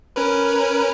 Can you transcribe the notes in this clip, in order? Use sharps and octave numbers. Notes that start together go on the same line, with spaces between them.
C#4 A#4 B4